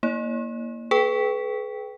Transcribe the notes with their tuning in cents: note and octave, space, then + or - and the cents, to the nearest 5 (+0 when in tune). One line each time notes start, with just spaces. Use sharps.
A#3 +0 E4 -35 C#5 +15
G#4 +45 B4 +5 G5 +0